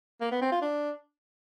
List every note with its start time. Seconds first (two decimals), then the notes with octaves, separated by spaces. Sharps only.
0.21 A#3
0.31 B3
0.41 C4
0.51 F4
0.62 D4